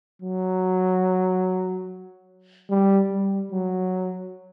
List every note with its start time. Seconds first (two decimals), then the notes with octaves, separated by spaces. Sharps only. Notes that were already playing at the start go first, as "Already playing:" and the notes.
0.22 F#3
2.70 G3
3.11 G3
3.52 F#3